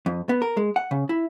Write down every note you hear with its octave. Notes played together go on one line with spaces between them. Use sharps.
F2
B3
A#4
G#3
F#5
C#3
E4